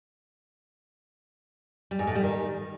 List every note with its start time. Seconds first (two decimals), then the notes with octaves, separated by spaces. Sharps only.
1.91 G3
1.99 G#2
2.07 A2
2.15 G3
2.24 D#3